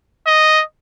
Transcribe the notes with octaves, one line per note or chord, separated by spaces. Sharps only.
D#5